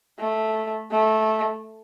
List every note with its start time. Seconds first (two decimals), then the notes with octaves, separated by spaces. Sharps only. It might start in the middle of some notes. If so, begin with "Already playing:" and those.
0.19 A3
0.91 A3